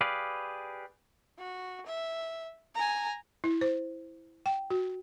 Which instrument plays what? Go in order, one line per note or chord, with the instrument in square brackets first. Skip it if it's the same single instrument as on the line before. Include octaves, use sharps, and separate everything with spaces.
[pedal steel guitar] G4 G#4 B4 D5 F5
[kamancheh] F#4
E5
G#5 A#5
[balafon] E4
C5
G5
F#4